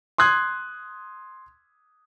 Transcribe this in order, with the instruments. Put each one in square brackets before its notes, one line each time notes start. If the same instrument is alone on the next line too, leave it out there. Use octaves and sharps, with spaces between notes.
[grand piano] C6 D#6 F#6 G#6